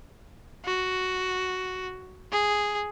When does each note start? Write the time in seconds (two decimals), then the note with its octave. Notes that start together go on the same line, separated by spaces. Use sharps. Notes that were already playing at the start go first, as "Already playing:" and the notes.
0.65 F#4
2.32 G#4